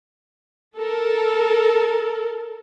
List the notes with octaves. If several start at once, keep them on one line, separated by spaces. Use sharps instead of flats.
A4 A#4